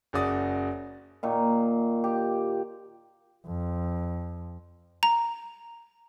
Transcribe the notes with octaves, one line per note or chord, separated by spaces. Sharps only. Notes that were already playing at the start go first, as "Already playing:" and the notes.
F#1 C#3 F#4 D5 D#6 A6
A#2 D#3
G4
F2
A#5